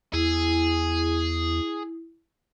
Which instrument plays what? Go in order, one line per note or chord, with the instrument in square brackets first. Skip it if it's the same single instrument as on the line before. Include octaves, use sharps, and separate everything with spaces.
[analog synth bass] E2 [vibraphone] E4 [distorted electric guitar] G#4